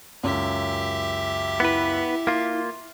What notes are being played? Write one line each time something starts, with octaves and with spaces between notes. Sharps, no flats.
C#2 F#2 G4 E5
B3 E4 B4
A#3 F4 C6